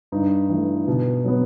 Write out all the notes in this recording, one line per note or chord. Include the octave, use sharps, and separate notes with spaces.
G2 D#4
E3
A3
B2
F#3 B3